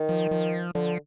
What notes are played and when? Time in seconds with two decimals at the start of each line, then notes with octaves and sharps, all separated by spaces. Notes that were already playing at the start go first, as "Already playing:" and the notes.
Already playing: D#3
0.09 F3
0.31 F3
0.75 D3 F3